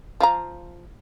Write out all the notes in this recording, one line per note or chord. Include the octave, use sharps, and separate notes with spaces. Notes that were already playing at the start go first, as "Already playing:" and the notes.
F3 F5 A#5